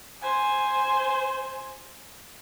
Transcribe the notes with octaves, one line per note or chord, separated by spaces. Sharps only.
C5 G#5